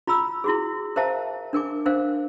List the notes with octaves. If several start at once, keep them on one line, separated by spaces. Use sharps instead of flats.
F4 A#5 B5 E6
E4 F#4 G#4
A#4 C5 E5 F5 A5 A#5
D4 A#4 G#5 D6
D4 A#4 C5 F5